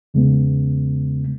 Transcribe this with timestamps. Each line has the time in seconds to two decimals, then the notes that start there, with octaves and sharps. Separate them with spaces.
0.14 E2 C#3 G#3 B3